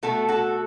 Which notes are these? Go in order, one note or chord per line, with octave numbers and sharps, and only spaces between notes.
B2 A3 F#4 A4
F#4 A4